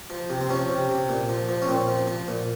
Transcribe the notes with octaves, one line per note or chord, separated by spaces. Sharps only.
F3
C3
C4
F3 C#4
C3
C3
A#2
F3
F3
C#4
A#2 C4
F3
F3
A#2